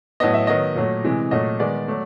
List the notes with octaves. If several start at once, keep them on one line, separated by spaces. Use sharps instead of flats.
A2 F#3 B3 D#5
E5
D#3 F#3 B3 D#5
A#2 F#3 A3
C3 E3 G#3
A#2 F#3 A3 D#5
D#3 G#3 B3 D5
F#3 A3